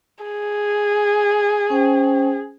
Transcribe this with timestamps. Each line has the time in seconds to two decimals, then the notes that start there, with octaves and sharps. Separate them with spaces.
0.25 G#4
1.70 C#4 C5 G5